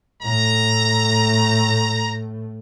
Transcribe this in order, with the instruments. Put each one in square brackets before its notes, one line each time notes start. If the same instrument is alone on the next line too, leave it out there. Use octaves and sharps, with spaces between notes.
[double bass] A2 A3 [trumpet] A#5